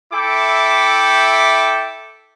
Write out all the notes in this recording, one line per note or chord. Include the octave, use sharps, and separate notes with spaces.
E4 A4 E5 G5 D6